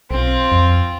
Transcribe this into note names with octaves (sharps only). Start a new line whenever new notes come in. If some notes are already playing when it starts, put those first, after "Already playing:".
B1 C4 F4
F2